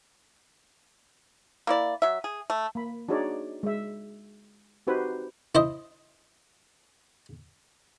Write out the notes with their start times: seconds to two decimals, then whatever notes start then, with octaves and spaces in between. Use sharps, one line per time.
1.67 A#3 E4 D5
2.02 F#3 E5
2.24 G#4
2.50 A3
2.75 A#3 B5
3.09 D4 D#4 F#4 G#4 C#5 D5
3.63 G#3 E5
4.87 C4 D#4 F#4 G4 B4 C5
5.55 E4 C5 D#5